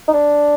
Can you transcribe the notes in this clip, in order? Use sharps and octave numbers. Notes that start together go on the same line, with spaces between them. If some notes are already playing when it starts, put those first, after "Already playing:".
D#4
D4